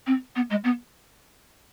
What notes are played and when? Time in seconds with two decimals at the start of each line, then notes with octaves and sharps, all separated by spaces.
0.06 C4
0.36 B3
0.50 G#3
0.64 B3